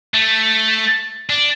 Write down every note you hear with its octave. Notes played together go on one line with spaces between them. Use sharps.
A3
D4